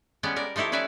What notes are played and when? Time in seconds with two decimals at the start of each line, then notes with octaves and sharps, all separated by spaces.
0.23 G3 G#3 B3 C#4 D5
0.36 A#4 D5
0.56 F3 A3 D#4 E4 G4
0.72 C#4 E4 B4 D5 E5